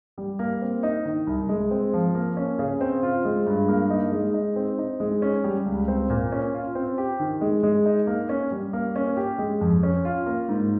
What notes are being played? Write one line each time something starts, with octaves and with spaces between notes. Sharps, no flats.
G3
A#3
C4
D#4
D#3
C2
G#3
C4
F3
A#3
C#4
C#3
C4
F4
G#3
G2
A#3
D#4
G#3
D#4
C4
D#4
G#3
C#4
G3
C#2
C4
A#2
C#4
F4
C4
G4
D#3
G#3
G#3
D#4
A#3
C#4
G3
A#3
C#4
G4
G#3
F2
C#4
F4
A#3
G#2